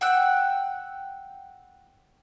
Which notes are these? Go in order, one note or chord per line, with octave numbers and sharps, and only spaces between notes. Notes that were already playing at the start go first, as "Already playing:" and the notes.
F#5 G5 E6 F#6